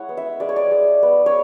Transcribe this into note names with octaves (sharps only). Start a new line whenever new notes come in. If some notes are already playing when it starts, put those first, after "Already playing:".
Already playing: G#3 E4 C#5 F#5
B3
E5
G#3 D5
C#5
D5
G#3
B3
C#5